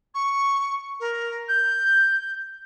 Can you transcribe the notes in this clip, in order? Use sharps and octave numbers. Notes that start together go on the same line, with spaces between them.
C#6
A#4
G6